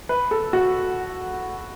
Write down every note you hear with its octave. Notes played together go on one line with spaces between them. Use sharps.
B4
A4
F#4